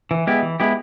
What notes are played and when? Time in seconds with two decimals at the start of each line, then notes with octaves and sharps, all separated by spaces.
0.11 E3
0.27 G#3 B3 E4 G4
0.42 E3
0.60 G#3 B3 E4 G4